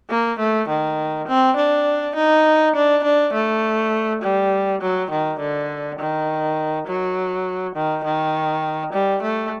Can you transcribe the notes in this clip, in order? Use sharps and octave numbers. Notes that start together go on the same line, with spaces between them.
A#3
A3
D#3
C4
D4
D#4
D4
D4
A3
G3
F#3
D#3
D3
D#3
F#3
D#3
D#3
G3
A3